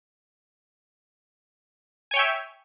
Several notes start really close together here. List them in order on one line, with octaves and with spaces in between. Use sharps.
G#5 C#5 G5 E5